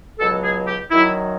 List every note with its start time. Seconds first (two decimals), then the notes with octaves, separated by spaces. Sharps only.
0.19 C#2 B2 F#3 A4
0.43 G#4
0.67 G4
0.91 F#2 D#3 F#3 E4